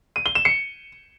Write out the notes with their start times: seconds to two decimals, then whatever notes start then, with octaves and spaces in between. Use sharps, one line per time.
0.16 D#7
0.26 G7
0.35 E7
0.45 C#7